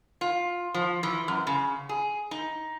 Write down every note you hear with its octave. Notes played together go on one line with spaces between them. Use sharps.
F4
F3
E3
F#2
C#3
G#4
D#4